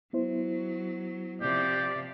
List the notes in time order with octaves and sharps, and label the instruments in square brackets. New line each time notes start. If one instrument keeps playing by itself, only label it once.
[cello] F#3 [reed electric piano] B3 E4 C5
[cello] C3 F3 [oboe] G4 [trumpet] D5